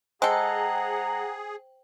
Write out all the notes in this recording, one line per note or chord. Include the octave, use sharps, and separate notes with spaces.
G#3 G#4 A4 C5 F#5 G5 A#5